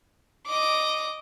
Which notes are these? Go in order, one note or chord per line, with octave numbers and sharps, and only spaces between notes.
D#5 D6